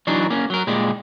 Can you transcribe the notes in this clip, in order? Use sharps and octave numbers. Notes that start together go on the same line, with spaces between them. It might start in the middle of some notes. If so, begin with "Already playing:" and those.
E3 F#3 D4 D#4
A#3 C#4
F#3 A#4
A#2 G3 G#3